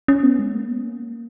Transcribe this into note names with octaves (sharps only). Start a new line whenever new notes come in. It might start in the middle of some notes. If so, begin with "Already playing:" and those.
C#4
B3
G#3
A#3
B3
A#3